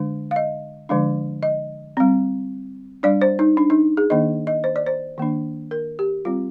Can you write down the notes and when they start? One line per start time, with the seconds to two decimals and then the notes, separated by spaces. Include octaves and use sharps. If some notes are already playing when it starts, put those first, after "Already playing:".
Already playing: D3 G#3 D4
0.31 F5
0.36 D#5
0.89 D3 F3 G#3 D4
1.43 D#5
1.97 G3 C4
3.03 G3 D4 D5
3.21 C5
3.39 D#4
3.57 D4
3.70 D#4
3.97 G#4
4.10 D#3 A#3 D4 D#5
4.47 D#5
4.64 C5
4.76 D5
4.86 C5
5.18 D#3 A#3 D4
5.71 A#4
5.99 G4
6.25 G3 C4 F4